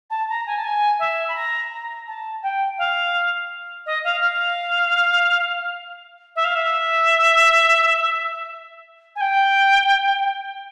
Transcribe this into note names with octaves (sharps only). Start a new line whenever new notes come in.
A5
A#5
G#5
A5
G#5
E5
B5
A#5
A#5
A5
G5
F5
D#5
F5
F5
E5
F5
E5
G#5
G5